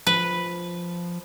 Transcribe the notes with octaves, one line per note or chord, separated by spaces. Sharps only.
F3 B4